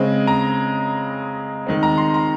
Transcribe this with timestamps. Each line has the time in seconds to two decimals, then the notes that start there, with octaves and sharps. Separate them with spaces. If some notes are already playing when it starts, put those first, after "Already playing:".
Already playing: C#3 G#3 C4
0.27 A#5
1.67 D#3 G#3 C4
1.83 A#5
1.98 C6
2.14 A#5